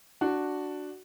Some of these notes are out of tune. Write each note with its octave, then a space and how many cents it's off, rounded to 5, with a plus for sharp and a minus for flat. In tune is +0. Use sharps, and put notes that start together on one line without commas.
D4 +0 F#4 +0